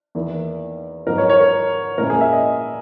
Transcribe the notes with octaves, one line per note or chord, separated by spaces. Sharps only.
E2 D#3 A#3 E4
G#2 F#3 B3 D#4 A#4
C#5
C#5
A#4
A#2 G#3 C#4 E4 A#4
G#4
E5
D#5